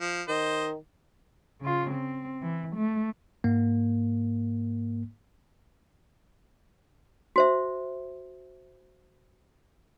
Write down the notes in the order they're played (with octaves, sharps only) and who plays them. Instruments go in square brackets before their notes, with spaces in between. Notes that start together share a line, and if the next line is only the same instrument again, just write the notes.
[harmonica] F3
[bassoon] D#3 [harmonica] C5 D#5
[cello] C#3 F4
C4
E3
A3
[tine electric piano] G#2 A#3
[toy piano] F#4 C5 E5